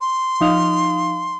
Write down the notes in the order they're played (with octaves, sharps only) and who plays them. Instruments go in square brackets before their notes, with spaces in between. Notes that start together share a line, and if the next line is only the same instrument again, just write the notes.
[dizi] C6
[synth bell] F3 D#4 F5